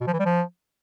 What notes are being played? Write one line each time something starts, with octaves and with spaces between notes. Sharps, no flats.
B2
F3
E3
G3
F3